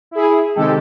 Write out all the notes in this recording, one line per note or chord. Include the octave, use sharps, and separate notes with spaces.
E4 G#4
C3 D#3 G#3 G4 A4